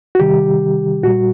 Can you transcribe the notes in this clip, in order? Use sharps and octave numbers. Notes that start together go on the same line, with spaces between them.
F#4
C3 D#3 G3 G4
A#2 G3 F#4